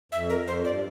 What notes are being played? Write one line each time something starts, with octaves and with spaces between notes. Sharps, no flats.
F2 E5
A#4
F2
C5
G2 D5